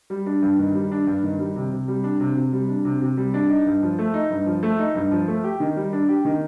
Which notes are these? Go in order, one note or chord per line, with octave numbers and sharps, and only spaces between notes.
G3
D4
G2
D#3
G3
D4
G2
D#3
G3
C3
C3
G3
D4
C3
C3
G3
D4
C3
C3
G3
D4
D#4
G2
F3
A3
D#4
G2
F3
A3
D#4
G2
F3
A3
G4
D#3
G3
D4
G4
D#3